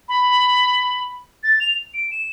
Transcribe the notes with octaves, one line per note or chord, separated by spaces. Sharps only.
B5
A6
F7
D7
E7